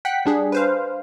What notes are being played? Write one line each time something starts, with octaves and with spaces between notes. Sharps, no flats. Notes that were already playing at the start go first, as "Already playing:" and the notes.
F#5 G5 F#6 B6
G3 D4 G#4
B4 C5 F5